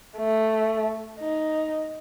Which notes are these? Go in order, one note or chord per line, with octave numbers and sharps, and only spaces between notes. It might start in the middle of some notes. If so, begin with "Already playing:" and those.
A3
D#4